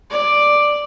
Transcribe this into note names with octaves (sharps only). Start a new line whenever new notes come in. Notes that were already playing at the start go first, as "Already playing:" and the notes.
D5